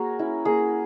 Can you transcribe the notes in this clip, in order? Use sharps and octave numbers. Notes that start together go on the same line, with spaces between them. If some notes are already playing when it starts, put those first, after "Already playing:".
Already playing: A#3 F#4 G#4 A#4 C#5
C#4 E4
A#3 G#4